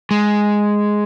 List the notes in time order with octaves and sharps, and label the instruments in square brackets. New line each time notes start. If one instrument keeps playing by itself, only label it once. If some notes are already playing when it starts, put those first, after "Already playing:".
[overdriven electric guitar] G#3